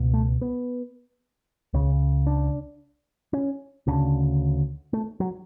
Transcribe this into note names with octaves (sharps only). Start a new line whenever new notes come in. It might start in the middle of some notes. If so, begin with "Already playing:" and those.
Already playing: C#2 B2
A3
B3
C#2 C#3 C#4
D4
C#4
D2 C#3 D4
A3
F#3